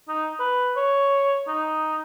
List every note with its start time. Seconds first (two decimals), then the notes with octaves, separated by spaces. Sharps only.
0.08 D#4
0.40 B4
0.76 C#5
1.48 D#4